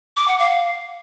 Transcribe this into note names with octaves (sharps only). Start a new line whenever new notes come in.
D6
F#5
F5